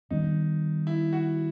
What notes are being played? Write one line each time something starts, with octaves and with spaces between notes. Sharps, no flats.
D#3 G3 B3 D#4
E4
F#4